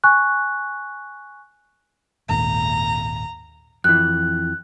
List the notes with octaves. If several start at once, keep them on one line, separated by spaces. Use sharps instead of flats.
G#5 C#6 F#6
G#1 D#2 A#2 A#5
F2 E3 F#6